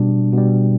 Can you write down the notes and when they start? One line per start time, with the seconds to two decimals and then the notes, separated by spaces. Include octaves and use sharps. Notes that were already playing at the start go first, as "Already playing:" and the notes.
Already playing: B2 G3 D4
0.33 B2 G3